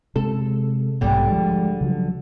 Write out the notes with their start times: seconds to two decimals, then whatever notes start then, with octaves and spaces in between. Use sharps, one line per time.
0.16 C3 G#3 A4
1.01 B1 G#2 B2 D3 G3
1.29 F3 G#3
1.81 C#3 F3 F#3